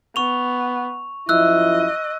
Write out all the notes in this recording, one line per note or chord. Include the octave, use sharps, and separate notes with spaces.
B3 C#6 F7
F#2 F3 E4 D#5 E6 F#6